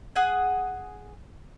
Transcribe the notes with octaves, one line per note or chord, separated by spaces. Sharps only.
G#4 F#5 G#5